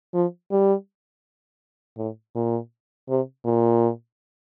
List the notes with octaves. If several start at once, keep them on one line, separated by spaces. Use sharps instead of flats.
F3
G3
A2
A#2
C3
A#2